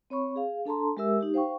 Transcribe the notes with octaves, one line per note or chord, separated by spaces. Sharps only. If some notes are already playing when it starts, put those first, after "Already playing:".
C4 C#5 B5 C#6
G#4 F5
D4 A4 A5 A#5 C6
G#3 G4 A#4 E5 E6
D#4 G4
C5 F5 G5 C#6